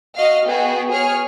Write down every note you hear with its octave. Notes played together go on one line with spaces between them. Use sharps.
F#4 D#5 F5 F6
B3 F#4 G#4 G5
G#4 C#5 F6